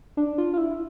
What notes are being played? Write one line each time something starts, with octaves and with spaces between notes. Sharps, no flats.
D4
F4
F4
E4